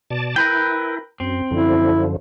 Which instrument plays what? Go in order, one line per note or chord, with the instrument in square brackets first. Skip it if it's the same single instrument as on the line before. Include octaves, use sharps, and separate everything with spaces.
[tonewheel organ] B2 D5 A5
[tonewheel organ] E4 [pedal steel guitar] A#4 B4 G5
[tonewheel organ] F#2 [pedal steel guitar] C4
[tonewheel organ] F#2 D3 F3 [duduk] E4